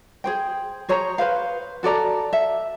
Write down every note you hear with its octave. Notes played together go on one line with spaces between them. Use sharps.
G#4 C5 G5
G#4 C5 C#5 A#5
B4 C5 F5
F#4 A4 D5 A#5
E5